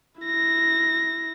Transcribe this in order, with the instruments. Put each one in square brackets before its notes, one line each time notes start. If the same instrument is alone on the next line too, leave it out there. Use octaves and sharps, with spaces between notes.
[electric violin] E4 A#6